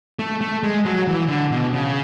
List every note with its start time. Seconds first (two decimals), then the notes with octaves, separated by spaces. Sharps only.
0.19 A3
0.41 A3
0.63 G#3
0.85 F#3
1.07 E3
1.28 D3
1.51 B2
1.73 C#3